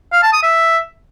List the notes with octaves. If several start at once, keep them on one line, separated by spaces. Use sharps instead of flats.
F5
A5
D#6
E5